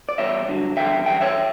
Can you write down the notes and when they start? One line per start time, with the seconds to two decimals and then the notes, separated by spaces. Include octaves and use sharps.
0.09 D5
0.18 E2 B2 G3 C#5 E5
0.48 G2 D3 F#3
0.77 E2 D3 G3 E5 G5
1.06 F#2 E3 G3 E5 G5
1.21 C#5 E5